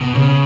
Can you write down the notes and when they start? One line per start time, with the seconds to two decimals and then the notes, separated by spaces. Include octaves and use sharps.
0.01 B2
0.15 C#3